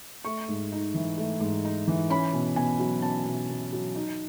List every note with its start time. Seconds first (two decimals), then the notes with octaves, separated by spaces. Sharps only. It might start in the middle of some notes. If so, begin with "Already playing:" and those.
0.25 A3 C#6
0.48 G#2
0.72 D#4
0.94 E3
1.18 A3
1.40 G#2
1.65 D#4
1.88 E3
2.10 C#4 B5
2.33 B2
2.56 B2 G#5
2.79 F#3
3.02 C#4 A5
3.25 B2
3.49 B2
3.73 F#3
3.95 D#4